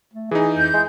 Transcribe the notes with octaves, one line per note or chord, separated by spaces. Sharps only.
A3
E3 D#4 G#4
F2 G6
G#3 E4